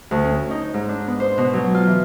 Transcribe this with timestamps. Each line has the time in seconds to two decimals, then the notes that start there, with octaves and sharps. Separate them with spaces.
0.11 D2
0.24 C#4
0.51 D#4
0.74 G#2
0.89 D4
1.08 B3
1.20 C5
1.38 B2
1.53 F#3
1.75 F4
1.87 E3